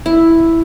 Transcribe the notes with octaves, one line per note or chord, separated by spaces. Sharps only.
E4